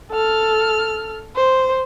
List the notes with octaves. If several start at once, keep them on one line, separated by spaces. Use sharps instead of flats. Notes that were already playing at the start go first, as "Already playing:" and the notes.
A4 F6
C5